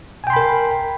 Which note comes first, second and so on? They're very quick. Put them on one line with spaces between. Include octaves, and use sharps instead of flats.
G#5 G5 C6 B5 A#4